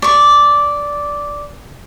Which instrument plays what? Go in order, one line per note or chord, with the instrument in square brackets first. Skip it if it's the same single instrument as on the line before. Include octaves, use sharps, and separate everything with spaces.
[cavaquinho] D5 C#6